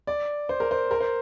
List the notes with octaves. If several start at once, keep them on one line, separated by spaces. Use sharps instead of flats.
D5
C5
A#4
C5
A#4
C5